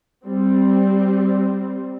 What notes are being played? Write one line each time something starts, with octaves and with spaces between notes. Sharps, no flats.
G3 C4